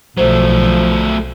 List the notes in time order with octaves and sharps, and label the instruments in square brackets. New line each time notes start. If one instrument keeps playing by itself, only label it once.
[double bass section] B1 [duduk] F3 [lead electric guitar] F#3 A3 [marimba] C5